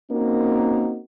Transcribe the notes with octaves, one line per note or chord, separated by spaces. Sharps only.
A#3 C4 C#4 D#4 F#4 A#4